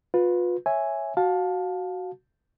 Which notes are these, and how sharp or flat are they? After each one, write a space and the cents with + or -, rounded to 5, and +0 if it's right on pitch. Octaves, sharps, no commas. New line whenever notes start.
F4 +35 B4 +0
C#5 -5 E5 +0 G#5 +0
F#4 +0 F5 +25 A5 -5